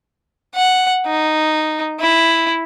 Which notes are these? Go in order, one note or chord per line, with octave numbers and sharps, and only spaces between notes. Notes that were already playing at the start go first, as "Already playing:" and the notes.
F#5
D#4
E4